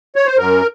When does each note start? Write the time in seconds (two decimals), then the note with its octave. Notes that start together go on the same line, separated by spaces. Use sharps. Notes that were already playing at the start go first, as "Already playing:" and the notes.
0.16 C#5
0.26 C5
0.37 F#2 A#4